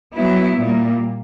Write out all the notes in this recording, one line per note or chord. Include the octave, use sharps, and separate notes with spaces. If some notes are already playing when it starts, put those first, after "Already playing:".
F#3 B3 E4
A#2 G3 A#3